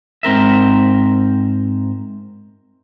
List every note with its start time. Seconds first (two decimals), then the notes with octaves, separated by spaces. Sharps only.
0.23 G#2 C4 A#4 E5